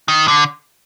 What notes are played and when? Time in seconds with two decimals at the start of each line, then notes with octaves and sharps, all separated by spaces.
0.08 D#3
0.28 D3